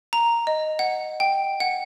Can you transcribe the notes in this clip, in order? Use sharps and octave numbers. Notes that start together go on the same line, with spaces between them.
A#5
D#5
F#5
G5
F#5